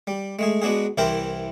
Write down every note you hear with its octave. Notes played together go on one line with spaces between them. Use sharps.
G3
G#3 A3 G#4
G#3 B3 D4 F#4 G#4
C2 E3 E4 A#4 C5 G5